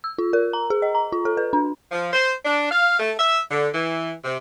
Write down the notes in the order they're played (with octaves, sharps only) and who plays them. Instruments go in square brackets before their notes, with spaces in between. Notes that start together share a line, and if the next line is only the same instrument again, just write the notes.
[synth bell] E6
F4
A#4
A#5
G#4
D#5
A#5
F4
A4
B4
D4
[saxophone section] F3
C5
D4
F5
A3
E5
D3
E3
C3